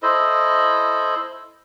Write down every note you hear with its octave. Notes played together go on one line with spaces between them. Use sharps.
E4 A4 C5 D#5